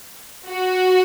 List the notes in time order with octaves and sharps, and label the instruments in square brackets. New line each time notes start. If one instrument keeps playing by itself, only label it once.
[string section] F#4